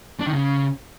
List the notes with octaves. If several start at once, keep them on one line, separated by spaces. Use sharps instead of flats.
D4
D#3
C#3